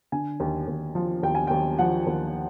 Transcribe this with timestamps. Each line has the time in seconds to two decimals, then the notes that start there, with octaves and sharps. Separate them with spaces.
0.12 D3 G#5
0.40 D#2
0.68 D#2
0.95 F3
1.23 D#2 G5
1.35 G#5
1.47 D#2 G5
1.79 F3 F#5
2.07 D#2